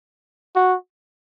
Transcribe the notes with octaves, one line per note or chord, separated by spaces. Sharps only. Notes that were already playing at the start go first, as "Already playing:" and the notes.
F#4